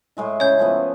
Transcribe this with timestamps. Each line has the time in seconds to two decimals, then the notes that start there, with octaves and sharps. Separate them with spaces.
0.17 A2 G#3 E4
0.40 C#3 C#5 G6
0.59 F3 A3 B3